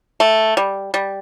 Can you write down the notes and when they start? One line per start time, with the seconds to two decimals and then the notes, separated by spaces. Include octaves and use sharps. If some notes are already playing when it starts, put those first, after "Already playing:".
0.20 A3
0.57 G3
0.94 G3